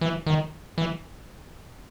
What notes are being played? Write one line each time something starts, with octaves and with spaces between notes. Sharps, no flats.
E3
D#3
E3